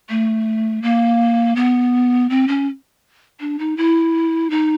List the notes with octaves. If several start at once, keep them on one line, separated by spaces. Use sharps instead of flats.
A3
A#3
B3
C4
C#4
D4
D#4
E4
D#4